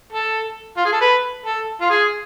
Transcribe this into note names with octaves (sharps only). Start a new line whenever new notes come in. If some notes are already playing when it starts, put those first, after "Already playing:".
A4
F4
G#4
A4
B4
A4
F4
G#4